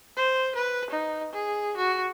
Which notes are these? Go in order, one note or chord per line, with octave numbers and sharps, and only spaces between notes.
C5
B4
D#4
G#4
F#4